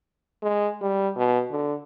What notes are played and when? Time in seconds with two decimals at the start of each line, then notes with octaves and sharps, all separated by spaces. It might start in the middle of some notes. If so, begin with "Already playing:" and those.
0.42 G#3
0.81 G3
1.17 B2
1.51 D3